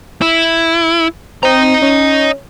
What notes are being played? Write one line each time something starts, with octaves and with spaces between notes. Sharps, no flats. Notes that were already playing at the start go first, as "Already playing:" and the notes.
E4
C4 D#5 A#5
C#4